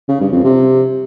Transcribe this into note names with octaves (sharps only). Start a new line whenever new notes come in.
C#3
G2
F2
C3